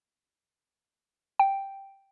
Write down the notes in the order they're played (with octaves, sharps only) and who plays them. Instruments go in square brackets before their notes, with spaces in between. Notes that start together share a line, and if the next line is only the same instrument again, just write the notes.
[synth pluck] G5